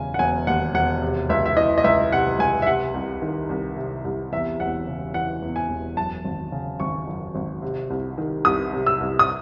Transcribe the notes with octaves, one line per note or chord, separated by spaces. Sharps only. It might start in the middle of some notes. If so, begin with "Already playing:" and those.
Already playing: E1 C#3 G#5
F#5
E1 G#5
D#2 F#5
E1 F#5
C3
C#2 E5
E5
E3 D#5
D#5
C#2 E5
C3 F#5
C#2 G#5
E5
C3 F#5
C2
D#3
C2
C3
C2
E2 E5
E1 F#5
C#3
E3 F#5
E2
G#5
E1
F#2 A5
G#1
C#3
G#1 C#6
F#2
G#1
C3
C2
D#3
C2 D#6
C3
E6
C2
D#6